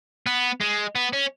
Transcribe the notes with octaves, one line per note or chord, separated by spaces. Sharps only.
B3
G#3
B3
C#4